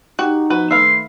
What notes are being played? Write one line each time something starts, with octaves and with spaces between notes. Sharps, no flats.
D#4 F#4 G4
F3 B3 F#4 B4
D#3 A3 B4 E5 F5 C6